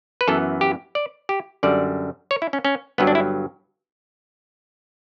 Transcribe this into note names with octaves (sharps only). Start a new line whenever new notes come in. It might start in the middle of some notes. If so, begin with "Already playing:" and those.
B4
F#2 E3 B3 A4
G4
D5
G4
F#2 D3 G3 D5
C#5
E4
C#4
C#4
G1 G2 F#3 B3
D4
E4